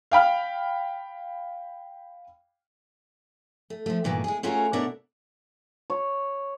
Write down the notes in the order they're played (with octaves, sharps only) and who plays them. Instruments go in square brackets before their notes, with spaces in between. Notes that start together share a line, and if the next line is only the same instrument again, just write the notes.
[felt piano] F5 G5 B5 F6
[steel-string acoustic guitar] A3
F3 A3
G2 A#2 D#3 E3
G#3 G#4
A3 C#4 F4 F#4 G#4 A#4
B2 D4 E4 A#4 C#5 F#5
[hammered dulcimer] C#5